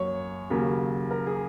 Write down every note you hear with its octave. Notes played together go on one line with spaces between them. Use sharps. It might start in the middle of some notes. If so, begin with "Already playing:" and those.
Already playing: F#2 F#3 A#3 C#5
D#2 C#3 F#3 A#3
A#4
G#4